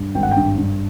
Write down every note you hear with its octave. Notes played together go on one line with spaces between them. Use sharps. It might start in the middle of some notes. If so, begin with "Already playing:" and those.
Already playing: G2
G#1 G5
F#5
G5
G2
G2